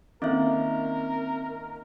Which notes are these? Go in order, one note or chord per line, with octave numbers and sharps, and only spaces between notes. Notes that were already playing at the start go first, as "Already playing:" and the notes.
D#3 A#3 C4 C#4 A#4 E5